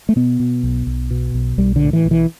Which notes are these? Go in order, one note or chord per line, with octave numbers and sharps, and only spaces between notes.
A3
B2 B3
B2
B1
B1
B2
B1
B1 G3
D3
A2
E3
B1
E3